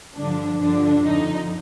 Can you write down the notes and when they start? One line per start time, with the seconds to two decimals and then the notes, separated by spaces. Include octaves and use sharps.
0.15 G2 D3 F3 D4
0.60 G2 D3 F3 D4
1.05 F2 D3 F3 D#4